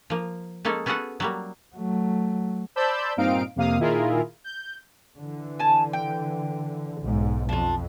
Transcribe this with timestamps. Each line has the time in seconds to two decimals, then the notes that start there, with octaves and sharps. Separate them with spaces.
0.10 F3 A#3
0.65 G#3 A#3 C#4 A4
0.86 B3 C#4 F#4 G#4 A4 F#5
1.20 F#3 G3 A#3
1.76 F#3 A3
2.76 C5 D5 A5 B5 E6 G6
3.17 G2 A#2 C4 D#4 F5 D7
3.56 F2 C3 A#3 F5 D#6
3.78 A#2 D#3 E4 F4 G#4 A#4
4.44 G6
5.17 D3 E3
5.59 G#5 A5
5.93 G5
7.00 B1 G#2
7.49 F2 D4 F4